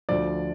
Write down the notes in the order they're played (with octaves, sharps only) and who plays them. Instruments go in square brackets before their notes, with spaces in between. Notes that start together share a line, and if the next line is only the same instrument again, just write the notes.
[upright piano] D2 D3 F3 D5